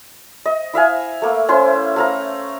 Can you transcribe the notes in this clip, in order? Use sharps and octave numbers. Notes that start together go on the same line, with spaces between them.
D#5
E4 E5 F5 G#5
A3 A#3
C#4 E4 C5 C6
A3 F5 A#5